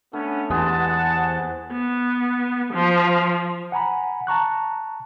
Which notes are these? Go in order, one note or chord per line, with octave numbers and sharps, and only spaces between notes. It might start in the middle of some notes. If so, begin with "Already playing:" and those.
A3 B3 C#4 D4
E2 G#3 B3 G4 G#4 F#5 A5
C5
B3
F3
F#5 G#5 A#5 B5
A5 A#5 C#6 F#6